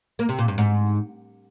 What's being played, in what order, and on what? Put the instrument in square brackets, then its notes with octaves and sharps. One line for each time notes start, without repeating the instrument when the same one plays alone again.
[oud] A#3
C3
A#2
G2
G#2